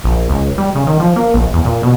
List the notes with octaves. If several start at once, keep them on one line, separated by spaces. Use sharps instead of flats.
A#1
C#2
G3
C#3
D#3
F3
A#3
A#1
E2
A#2
B2